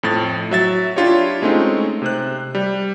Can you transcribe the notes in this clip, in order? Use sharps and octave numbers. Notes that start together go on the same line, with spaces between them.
F2 A2 A6
F#3 E5 A6
D4 E4 F4 G4 C#5
G#3 A3 C4 C#4 D#4
C3 C5 F#6
G3